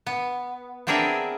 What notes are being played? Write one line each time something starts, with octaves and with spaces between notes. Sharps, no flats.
B3
B3 C4 D4 G#4 A#4 E5